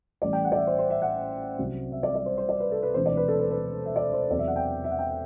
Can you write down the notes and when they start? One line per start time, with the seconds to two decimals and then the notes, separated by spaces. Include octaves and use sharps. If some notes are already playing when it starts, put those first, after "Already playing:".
0.22 A1 A2 E3 G3 D5
0.33 G5
0.45 F#5
0.52 D5
0.56 E5
0.67 C5
0.79 C5
0.90 E5
1.02 F#5
1.58 C2 C3 F#3
1.92 E5
2.03 D5
2.15 D5
2.26 C5
2.38 C5
2.49 D5
2.60 B4
2.72 A4
2.83 B4
2.94 E1 D2 C3 E3 C5
3.06 D5
3.17 B4
3.28 A4
3.39 B4
3.51 B4
3.86 E5
3.96 D5
4.13 C5
4.30 E2 C3 F#3 D5
4.39 E5
4.48 F#5
4.56 G5
4.84 E5
4.91 F#5
4.99 G5